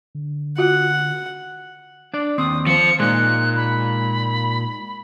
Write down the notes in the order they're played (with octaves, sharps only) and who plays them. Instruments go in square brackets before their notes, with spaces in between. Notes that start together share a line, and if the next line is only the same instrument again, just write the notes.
[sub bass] D3
[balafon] F4 F#4 [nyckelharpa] F#5
[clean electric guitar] D4 D5
[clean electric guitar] D#2 C4 [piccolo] D#6
[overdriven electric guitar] F3 C5 [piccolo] C#7
[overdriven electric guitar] A#2 [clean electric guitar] G#3 D#4 [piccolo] F#6
[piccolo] B5